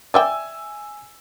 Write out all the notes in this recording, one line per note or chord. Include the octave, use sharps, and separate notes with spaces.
D5 E5 G5 G#5 E6